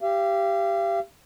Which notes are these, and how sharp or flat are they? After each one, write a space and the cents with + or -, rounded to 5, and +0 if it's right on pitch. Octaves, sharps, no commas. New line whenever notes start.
G4 +0 F5 -40